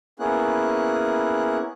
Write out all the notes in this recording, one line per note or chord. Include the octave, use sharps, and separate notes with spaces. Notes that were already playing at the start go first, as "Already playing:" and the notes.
A#3 B3 C#4 E4 G#4 F#6